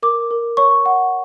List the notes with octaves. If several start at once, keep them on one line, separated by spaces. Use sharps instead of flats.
A#4 D6
A#4
C#5 C#6
F#5